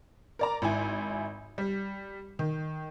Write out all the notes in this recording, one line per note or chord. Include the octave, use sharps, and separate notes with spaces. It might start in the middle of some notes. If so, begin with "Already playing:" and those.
A#4 D5 A#5
G#1 E4 G#5
G3
D#3